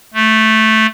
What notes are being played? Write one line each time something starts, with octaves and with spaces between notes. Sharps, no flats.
A3